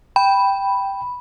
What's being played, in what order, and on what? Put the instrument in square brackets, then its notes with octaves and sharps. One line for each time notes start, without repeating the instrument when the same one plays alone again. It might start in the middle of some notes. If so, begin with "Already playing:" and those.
[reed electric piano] G5 [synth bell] B5